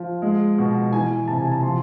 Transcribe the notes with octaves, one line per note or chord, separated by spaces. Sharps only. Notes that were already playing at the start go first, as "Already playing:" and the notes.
Already playing: F3
G#3
B2
E3 G#5
C3 A5
G#5
A5
F3 C6